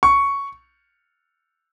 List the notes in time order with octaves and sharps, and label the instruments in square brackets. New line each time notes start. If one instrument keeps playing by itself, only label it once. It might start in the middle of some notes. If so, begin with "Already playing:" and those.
[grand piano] C#6